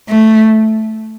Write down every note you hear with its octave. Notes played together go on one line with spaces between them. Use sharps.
A3